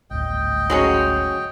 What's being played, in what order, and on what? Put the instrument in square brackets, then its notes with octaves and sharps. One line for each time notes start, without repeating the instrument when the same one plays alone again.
[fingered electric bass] G#1 D2 A2 [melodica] D#5 G5
[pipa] F#3 G#3 C#4